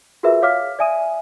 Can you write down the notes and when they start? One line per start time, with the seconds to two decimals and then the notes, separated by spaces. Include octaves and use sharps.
0.23 F4 F#4 G#4 A#4 B4 E5
0.42 C#5 F5 D6 F6 B6
0.79 D5 E5 G#5 D#6 D#7